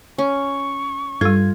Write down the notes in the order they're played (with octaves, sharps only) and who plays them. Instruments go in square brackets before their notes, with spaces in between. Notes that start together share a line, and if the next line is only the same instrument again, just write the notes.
[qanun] C#4 [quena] C#6
[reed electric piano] G2 G#6 [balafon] G3 A4 [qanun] F4